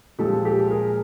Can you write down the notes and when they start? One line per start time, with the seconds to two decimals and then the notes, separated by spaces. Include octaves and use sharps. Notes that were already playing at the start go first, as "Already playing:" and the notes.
0.19 A#2 F3 G#3 G4 A4
0.45 G4 A4
0.71 G#4 A#4